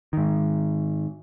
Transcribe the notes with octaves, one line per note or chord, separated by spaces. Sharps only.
G#2 D#3